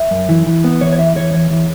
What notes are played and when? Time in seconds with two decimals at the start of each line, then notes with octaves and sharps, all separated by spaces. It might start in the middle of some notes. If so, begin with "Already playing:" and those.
Already playing: E5
0.11 F#2
0.29 E3
0.46 E3
0.64 B3
0.81 E3 C#5
0.93 C#5
0.98 E2 E5
1.16 E3 C#5
1.33 E2 C#5
1.51 E3